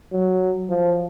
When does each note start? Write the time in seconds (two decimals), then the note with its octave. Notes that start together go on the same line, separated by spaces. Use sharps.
0.13 F#3
0.70 F3